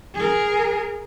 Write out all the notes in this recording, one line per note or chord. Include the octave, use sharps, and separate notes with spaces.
G#4 A#4